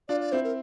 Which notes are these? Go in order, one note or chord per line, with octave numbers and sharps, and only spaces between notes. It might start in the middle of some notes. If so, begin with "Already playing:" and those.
D4 F4 D5
D5
C4 E4 C5
A#4